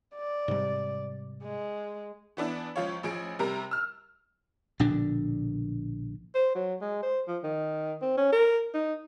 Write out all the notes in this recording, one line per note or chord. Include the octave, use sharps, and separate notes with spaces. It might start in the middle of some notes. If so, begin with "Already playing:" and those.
D5
G#2 C3 G3
G#3
E3 B3 D4 E4
C#2 F3 F4 C#5
A1 F3 G#4 D7
C3 G3 A#4 A#5
E6 F6
A#1 B2 D3 D4
C5
F#3
G#3
C5
F3
D#3
C4
C#4
A#4
D#4